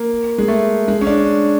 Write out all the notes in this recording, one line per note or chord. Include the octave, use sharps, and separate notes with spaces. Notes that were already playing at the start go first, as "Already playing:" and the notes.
Already playing: A#3
G#3
A3
G#3
C#4
D4